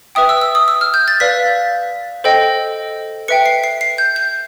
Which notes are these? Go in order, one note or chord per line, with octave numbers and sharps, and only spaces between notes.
B4 E5 G5 D#6
E6
E6
D#6
E6
F6
G6
A6
B4 D5 F5 B6
A4 C5 D#5 G5
B4 E5 G5 C#7
C7
C7
C7
G6
G6